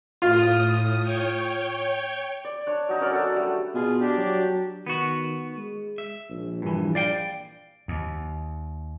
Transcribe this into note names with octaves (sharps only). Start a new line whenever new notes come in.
A2 F4 D#6
C#5 G5
D5
D4 C#5
F#3 D#4
C#4 A#4 C#5 D5
D4 F#4 A4
G3 A3
B2 F4 G#4
D4 G4
F#3
D#3 B3 F#4
G#3
E5
A#1
G2 E3
D5 F5 G5
D#2